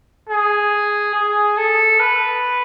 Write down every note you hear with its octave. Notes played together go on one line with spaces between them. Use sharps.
G#4
G#4
A4
B4